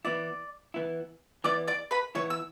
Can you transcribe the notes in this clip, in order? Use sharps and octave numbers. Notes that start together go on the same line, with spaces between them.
E3 B3 E4 D5 D6
E3 B3 E4
E3 B3 E4 D5 D6
D5 D6
B4 B5
E3 B3 E4 C#5 C#6
E6